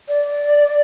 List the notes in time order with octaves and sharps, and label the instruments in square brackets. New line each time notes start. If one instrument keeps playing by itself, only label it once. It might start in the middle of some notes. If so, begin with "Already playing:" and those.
[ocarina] D5